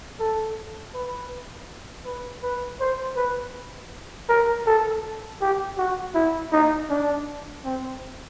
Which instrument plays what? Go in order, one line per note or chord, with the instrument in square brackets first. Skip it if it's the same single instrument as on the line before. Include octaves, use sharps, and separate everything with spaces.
[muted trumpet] A4
B4
B4
B4
C5
B4
A#4
A4
G4
F#4
E4
D#4
D4
C4